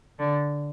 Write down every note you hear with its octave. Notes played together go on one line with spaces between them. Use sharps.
D3